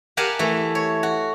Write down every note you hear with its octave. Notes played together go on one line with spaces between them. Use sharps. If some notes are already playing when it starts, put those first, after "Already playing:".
G4 A#4 F5 F#5 G#5 A5
E3 A3
C#5
F#4